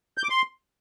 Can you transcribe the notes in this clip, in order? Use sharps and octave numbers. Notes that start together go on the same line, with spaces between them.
G6
D6
C6